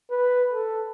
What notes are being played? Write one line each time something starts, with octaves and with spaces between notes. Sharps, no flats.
B4
A4